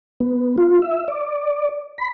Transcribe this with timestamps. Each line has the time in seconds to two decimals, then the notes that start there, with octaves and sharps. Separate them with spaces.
0.20 B3
0.58 F4
0.82 E5
1.08 D5
1.98 B5